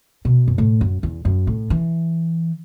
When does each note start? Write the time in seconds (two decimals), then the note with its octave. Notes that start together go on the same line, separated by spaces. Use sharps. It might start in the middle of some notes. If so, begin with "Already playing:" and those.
0.25 B2
0.48 F#2
0.58 A2
0.81 F#2
1.03 E2
1.25 F#2
1.47 A2
1.70 E3